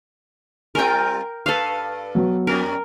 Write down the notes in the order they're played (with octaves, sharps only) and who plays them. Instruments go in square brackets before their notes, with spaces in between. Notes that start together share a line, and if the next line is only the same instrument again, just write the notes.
[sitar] G3 C4 F4 [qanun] A#4 G5
[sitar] G2 B4 [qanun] A4 F5
[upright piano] F#3 B3
[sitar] F2 G3 [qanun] A#4